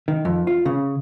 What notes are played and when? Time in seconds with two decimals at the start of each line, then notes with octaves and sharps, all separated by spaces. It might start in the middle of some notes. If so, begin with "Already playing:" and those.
0.08 D#3
0.25 F2
0.47 F4
0.65 C#3